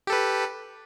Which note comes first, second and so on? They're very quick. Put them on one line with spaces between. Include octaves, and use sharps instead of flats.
G4 A4 B4